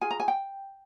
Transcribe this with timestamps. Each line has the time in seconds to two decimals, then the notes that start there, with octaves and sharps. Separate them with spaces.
0.01 F4 G#4 G#5
0.11 A#5
0.20 G#5
0.28 G5